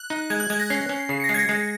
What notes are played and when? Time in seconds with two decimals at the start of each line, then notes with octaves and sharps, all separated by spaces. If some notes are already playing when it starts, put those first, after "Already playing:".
Already playing: F#6
0.10 D#4
0.30 G#3 G#6
0.40 F#6
0.50 G#3 G#6
0.60 A#6
0.70 C#4 C7
0.89 C#4
1.09 C#3 C7
1.20 C#7
1.24 A#6
1.29 G#3 C7
1.34 G#6
1.39 A#6
1.49 G#3